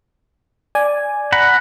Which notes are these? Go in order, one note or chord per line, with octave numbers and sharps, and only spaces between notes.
D5 G#5
F#5 A#5 B5